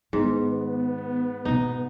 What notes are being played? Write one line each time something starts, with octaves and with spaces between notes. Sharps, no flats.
G#2 D#3 B3
B2 C4 D#4